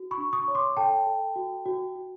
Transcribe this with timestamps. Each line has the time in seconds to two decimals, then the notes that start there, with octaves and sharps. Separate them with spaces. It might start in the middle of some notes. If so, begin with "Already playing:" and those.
Already playing: F#4
0.11 B5 C#6
0.18 D4
0.33 C#6 D#6
0.48 C#5
0.55 C6 D6
0.77 A4 G5 A5
1.07 A4
1.36 F#4
1.66 F#4
1.95 F#4